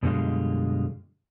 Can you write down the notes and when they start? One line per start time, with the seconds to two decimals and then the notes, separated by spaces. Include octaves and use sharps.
0.03 F#2 B2 D3 G3 G#3 F4